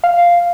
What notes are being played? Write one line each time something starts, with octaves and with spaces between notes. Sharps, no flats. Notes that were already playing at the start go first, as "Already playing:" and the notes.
F5